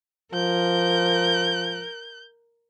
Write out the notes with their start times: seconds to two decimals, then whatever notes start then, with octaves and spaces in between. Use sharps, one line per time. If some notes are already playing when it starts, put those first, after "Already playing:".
0.34 F3 A#4 G6